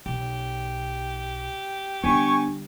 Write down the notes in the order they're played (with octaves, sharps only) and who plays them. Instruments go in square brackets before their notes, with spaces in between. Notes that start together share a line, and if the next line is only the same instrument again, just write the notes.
[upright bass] B1 [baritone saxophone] G4
[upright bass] D3 G3 [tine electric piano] B3 D4 [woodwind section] G#5 C#6